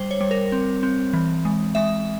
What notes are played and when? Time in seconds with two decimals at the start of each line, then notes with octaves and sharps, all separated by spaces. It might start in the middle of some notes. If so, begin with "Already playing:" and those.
Already playing: G3 C5
0.11 C#5
0.21 G3
0.31 A#4
0.52 C4
0.83 C4
1.13 E3
1.45 G#3
1.75 G#3 E5